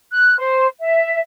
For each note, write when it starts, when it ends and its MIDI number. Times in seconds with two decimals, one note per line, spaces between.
0.12 0.35 90
0.38 0.67 72
0.81 1.20 76